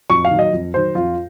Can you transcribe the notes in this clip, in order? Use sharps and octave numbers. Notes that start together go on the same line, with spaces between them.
F2 C#6
F5
D#3 F#3
D#5
F2
D#3 F#3 C5
F2 F4